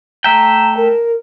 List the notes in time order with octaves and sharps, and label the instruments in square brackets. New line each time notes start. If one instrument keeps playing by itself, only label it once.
[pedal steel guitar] A3 E5 G5 [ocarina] A#5
[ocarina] A#4